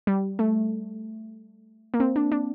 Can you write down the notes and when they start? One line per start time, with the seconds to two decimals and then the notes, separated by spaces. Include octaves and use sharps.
0.07 G3
0.39 A3
1.94 A#3
2.00 C4
2.16 D4
2.32 D4